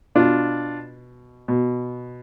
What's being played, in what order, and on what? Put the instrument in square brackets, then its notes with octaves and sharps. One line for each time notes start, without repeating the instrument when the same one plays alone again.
[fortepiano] B2 D4 F4
B2